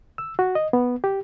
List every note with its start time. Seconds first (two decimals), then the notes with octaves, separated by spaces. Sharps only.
0.18 E6
0.39 F#4
0.55 D#5
0.73 B3
1.04 G4